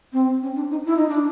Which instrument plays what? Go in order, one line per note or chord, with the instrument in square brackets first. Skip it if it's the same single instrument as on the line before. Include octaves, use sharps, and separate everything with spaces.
[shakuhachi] C4
C#4
D4
D#4
E4
D#4
D4